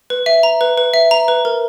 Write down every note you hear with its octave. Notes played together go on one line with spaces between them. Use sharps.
B4
E5
A#5
B4
B4
E5
A#5
B4
A#4